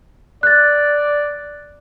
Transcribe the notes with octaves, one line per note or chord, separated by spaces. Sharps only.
D5 F#6 A6